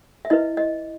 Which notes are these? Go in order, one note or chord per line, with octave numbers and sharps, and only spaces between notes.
E5
E4 B4 D#5
D#5